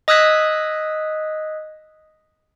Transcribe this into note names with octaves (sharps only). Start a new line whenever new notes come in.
D#5 D#6 E6 F#6 G#6 B6